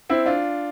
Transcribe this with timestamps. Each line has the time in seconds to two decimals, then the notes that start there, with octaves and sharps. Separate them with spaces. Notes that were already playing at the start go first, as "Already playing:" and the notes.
0.10 C4 E4
0.26 D4 F4